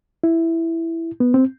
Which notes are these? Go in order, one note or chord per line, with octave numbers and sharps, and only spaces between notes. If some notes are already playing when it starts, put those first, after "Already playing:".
E4
B3
C4